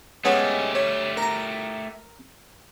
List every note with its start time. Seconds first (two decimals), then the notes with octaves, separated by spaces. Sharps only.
0.25 G#3 A3 B3 C#4 G4
0.75 C#5
1.17 A#4 A#5